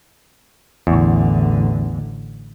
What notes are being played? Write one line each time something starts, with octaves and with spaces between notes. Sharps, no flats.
A1 E2 D3